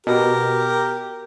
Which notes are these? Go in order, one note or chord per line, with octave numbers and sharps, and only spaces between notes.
B2 G4 A#4